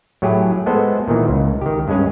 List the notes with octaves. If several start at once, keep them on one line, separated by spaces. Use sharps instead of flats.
A2 F#3 E4 G4 G#4
G#3 B3 A4 C5
A#2 D#3 E3
C#2
D#3 G4
G2 G#3 C#4 G#4